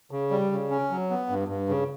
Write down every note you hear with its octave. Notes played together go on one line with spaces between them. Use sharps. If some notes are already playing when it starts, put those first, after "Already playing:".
C#3
G3
C#3
C#4
F#3
B3
G2
G2
C#3